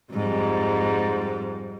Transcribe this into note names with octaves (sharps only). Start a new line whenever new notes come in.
F2 G#2 G3